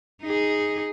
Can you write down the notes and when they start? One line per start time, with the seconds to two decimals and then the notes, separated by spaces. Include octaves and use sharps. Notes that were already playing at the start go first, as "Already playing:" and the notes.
0.23 D#4 G#4